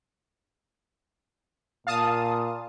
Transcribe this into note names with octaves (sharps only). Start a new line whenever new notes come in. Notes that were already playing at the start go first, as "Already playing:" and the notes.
A#2 F5 A5 D#6